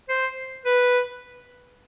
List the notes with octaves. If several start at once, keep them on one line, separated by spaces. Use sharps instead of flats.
C5
B4